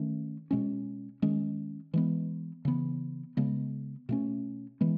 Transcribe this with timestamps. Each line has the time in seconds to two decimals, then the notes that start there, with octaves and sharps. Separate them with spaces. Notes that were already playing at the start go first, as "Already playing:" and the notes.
Already playing: D#3 A3 C#4
0.51 B2 G#3 C#4
1.22 D#3 G#3 C#4
1.94 E3 G#3 B3
2.65 C#3 E3 B3
3.37 C#3 G#3 B3
4.09 B2 A3 C#4
4.81 E3 G#3 B3